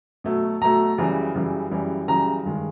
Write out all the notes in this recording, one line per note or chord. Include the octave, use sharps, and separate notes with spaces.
B2 F#3 A3
B2 F#3 A3 A#5
F#2 C#3 E3 G3
F#2 C#3 E3 G3
F#2 C#3 E3 G3
F#2 C#3 E3 G3 A#5
G2 D#3 G#3